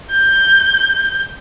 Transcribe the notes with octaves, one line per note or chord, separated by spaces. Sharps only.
G6